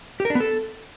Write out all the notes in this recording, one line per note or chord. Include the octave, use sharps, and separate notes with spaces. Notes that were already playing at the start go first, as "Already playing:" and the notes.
G4
A#4
D4
B3
A4